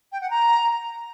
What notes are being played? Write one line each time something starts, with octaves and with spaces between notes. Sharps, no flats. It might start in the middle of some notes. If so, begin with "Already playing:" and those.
G5
F#5
A#5